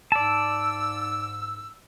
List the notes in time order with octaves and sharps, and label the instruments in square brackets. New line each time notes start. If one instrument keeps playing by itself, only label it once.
[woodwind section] G#2 E6 [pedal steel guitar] D5 A5